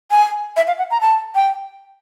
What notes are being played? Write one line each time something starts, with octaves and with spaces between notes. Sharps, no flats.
G#5
E5
F5
F#5
A#5
A5
G5